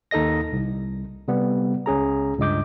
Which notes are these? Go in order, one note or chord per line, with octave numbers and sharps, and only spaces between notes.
D#2 D#4 A4 D#5 A#6
C2
C3 G3 B3
C#2 C#4 G#4 A#5
C#2 G2 D#5 D6 G6